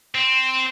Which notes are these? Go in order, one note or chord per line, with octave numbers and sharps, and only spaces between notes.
C4